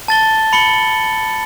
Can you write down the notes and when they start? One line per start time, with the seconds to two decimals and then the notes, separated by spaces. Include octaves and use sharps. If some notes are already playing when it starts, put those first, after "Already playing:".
0.08 A5 A6 G7
0.53 B5 C#7 F#7 G7